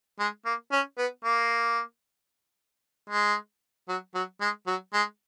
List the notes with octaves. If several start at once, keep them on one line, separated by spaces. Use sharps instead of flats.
G#3
A#3
C#4
B3
A#3
G#3
F#3
F#3
G#3
F#3
G#3